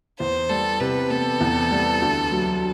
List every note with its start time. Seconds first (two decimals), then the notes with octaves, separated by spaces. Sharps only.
0.19 E2 C5
0.50 G3 A4
0.80 C3 B4
1.10 B3 A4
1.41 E2
1.71 G3
2.01 D2
2.31 F#3